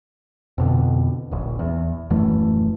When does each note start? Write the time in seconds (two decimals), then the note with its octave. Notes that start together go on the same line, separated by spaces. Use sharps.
0.58 F2 B2 D3
1.31 D#1 A#1
1.59 E2
2.10 D#1 F#2 E3 A3